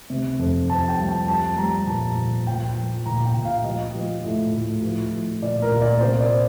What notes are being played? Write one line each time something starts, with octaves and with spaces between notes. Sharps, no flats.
C3
F2
F2 A5
G5
G3
A5
G3 A5
G3 A#5
A#2 A5
A#2
F3 G5
F3
A#2 A#5
G5
A#2
F5
F3 D#5
F3
A2
A2
F3
F3
A#2 D5
A#4
A#2
D5
C3 C5
D5